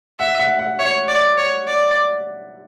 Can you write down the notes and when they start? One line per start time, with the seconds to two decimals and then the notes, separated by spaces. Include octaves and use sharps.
0.19 E5 F#5
0.39 F#5
0.59 F#5
0.79 C#5 E5
1.08 D5
1.38 C#5
1.67 D5